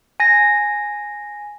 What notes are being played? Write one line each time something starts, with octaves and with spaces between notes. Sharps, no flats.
G#5 A#6